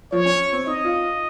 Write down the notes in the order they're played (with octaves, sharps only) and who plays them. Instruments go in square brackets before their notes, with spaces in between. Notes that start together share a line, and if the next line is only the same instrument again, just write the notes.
[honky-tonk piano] F3 [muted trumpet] C#5
[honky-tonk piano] C#4
C4
[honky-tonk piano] D#4 [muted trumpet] D#5
[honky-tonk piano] F4